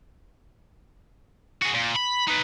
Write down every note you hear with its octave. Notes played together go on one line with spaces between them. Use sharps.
F#4 G#4
A#2
B5
D#4 B4